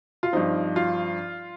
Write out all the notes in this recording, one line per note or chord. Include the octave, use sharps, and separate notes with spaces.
F4
G2 F3 C4 D#4
F4